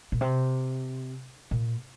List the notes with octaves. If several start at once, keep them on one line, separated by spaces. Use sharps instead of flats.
A#2
C3
A#2